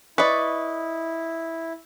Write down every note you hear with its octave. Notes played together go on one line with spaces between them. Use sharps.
E4 B4 D5 D#5 C#6